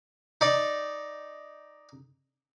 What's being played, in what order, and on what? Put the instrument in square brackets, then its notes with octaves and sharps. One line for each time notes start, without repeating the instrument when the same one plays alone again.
[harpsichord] D#4 D5